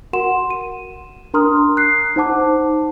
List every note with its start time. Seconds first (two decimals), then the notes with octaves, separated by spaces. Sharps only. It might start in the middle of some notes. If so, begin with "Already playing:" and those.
0.13 F#4 A#4 F#5 C6 E7
0.50 D#7
1.34 D4 A#4 A#5 C6 D#6 F6
1.77 F#6 C7
2.16 D#4 C5 F#5 A5 D6